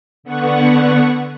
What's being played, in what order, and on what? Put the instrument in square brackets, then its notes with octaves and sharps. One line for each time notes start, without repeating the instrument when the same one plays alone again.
[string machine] D3 B3 F#5 C#6